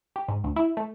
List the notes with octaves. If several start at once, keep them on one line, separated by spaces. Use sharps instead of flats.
G4
G#2
D2
E4
A3